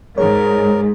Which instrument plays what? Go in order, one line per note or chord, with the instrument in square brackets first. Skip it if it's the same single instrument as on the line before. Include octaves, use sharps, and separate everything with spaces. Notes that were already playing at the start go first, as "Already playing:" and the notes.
[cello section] G#2 [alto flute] G#4 [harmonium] A#4 [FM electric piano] C#5